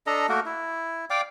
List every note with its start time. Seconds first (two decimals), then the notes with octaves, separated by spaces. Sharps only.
0.07 D4 A4 D#5 A#5
0.29 A3 A#3 F#4 A#4
0.46 E4
1.10 D5 F5 G5 D6